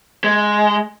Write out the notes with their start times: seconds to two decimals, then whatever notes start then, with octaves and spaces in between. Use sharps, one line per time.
0.24 G#3